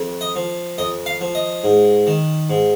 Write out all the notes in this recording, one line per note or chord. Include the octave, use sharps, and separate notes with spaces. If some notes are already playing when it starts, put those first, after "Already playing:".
Already playing: F2
D#5
F3
F2 D#5
F5
F3
D#5
G#2
D#3
G#2